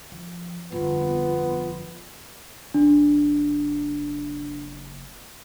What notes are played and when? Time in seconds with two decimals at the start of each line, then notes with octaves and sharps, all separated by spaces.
0.12 F3
0.72 G1 F2 B3 F4
2.74 F#1 D4